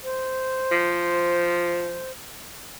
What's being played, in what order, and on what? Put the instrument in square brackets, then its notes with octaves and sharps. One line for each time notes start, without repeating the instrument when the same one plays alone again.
[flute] C5
[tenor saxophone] F3